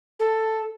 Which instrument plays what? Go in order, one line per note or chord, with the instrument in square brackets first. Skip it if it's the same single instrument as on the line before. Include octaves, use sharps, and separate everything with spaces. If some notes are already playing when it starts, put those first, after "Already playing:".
[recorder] A4